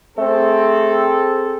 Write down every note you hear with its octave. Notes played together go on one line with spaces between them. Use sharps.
A3 C4 G#4 A4